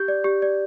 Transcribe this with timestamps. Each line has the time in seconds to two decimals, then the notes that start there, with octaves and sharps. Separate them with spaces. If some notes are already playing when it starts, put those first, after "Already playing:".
Already playing: G4 G6
0.08 D5
0.24 G4
0.42 D5